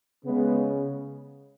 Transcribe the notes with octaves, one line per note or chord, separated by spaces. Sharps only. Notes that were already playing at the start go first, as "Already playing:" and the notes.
C#3 G#3 B3